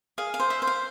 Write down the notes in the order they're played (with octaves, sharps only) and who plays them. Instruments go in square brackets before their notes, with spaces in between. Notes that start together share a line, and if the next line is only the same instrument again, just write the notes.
[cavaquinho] G#4 F5
F5
C5
E5
C5
F5